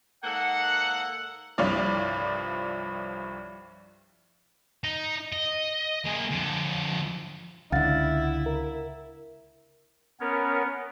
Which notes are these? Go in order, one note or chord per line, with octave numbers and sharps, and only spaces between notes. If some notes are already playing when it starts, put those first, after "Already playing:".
G#2 A#3 A4 F#5
C2 G2 F3 F4 C#5 D5
D#4
D#5
A#3 G#4
F2 D3
C#2 D3 E4 F5 F#5 A6
A#4
B3 C#4 A#4 C#5